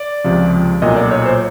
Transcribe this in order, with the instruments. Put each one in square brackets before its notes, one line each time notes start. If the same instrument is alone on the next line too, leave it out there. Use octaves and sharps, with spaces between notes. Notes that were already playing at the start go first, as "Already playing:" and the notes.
Already playing: [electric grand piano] D5
C#2 C3 F3
B1 A#2 F#3 D#5
D5
C#5
C5